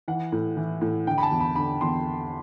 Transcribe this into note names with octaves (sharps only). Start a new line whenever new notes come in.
E3 F#5
A2
E3
A2
D3 G5
B5
A5
E2
B5
D3 B5
E2 C6